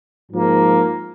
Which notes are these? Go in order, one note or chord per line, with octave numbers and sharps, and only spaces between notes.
G#2 F3 A#3